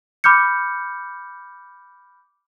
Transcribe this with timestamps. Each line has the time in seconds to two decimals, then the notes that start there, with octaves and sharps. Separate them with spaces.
0.24 B5 D6 F6 G6 C#7